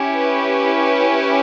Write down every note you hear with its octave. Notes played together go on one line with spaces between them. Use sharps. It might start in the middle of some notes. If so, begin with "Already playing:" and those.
Already playing: C#4 E4 G4
B4